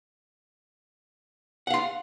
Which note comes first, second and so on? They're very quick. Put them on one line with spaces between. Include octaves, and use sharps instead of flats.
F#5 F5 C6